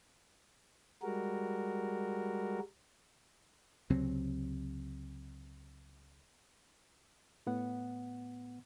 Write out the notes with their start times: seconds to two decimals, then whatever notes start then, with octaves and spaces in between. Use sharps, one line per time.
1.03 G3 G#3 F#4 A#4
3.90 C#2 C3 F#3 C4
7.47 A2 B3 F#5